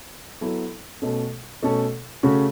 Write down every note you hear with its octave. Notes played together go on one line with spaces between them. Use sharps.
F#3 B3 E4 A4
B2 A3 C#4 A4
B2 A3 C#4 A4
C#3 A3 C#4 F#4